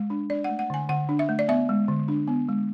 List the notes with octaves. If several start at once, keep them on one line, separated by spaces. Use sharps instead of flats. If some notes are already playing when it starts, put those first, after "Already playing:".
Already playing: G#3
D4
D4 D5
F#5
A3
F#5
D3 G#5
D3 F#5
D4
E5
A3
D5
B3 E5
G#3
D3
D4
B3
G#3